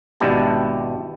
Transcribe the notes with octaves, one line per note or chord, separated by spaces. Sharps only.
G#1 B2 D4 E4 G4 A5